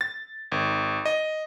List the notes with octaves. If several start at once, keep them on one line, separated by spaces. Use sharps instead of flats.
A6
G#1
D#5